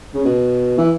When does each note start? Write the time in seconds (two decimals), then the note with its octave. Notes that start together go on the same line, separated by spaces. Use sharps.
0.14 C#3
0.25 B2
0.78 E3